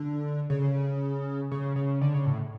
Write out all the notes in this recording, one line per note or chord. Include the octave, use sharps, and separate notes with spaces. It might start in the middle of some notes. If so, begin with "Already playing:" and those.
Already playing: D3
C#3
C#3
C#3
D3
C#3
A2